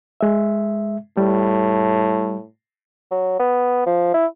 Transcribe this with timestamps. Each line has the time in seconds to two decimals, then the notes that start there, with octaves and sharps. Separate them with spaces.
0.21 G#3 E5
1.17 A2 G3
3.11 F#3
3.40 B3
3.86 F3
4.14 E4